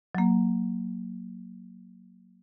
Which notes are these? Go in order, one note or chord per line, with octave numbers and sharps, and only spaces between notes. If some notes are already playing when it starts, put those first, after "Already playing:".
F#3 A#3